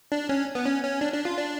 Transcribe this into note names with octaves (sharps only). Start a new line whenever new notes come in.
D4
C#4
B3
C#4
C#4
D4
D4
F4
D4